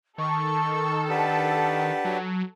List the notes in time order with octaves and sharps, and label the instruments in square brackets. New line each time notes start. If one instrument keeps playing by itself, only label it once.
[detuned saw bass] D#3 [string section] A4 [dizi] C#6
[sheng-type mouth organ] D4 G4 B4 [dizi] F#5
[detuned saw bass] F#3